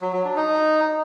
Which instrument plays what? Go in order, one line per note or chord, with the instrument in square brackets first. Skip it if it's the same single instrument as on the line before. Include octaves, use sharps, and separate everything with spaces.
[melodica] F#3
F#3
D4
D#4